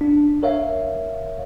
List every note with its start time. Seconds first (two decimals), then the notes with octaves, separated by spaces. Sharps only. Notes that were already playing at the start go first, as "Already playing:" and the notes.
0.01 D4
0.43 A#4 C#5 E5 F5